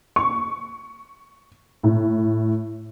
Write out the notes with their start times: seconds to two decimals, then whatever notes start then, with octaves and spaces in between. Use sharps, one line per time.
0.16 C#6
1.83 A2